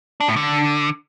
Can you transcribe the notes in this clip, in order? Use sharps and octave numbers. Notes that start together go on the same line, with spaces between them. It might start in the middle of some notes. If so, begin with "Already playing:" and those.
D4
A2
D3